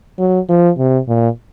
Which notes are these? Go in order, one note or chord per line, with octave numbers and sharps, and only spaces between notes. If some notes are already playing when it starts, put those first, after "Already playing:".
F#3
F3
C3
A#2